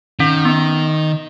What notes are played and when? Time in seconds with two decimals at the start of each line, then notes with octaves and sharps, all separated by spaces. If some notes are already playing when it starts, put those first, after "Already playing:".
0.19 D#3 C#4
0.45 B3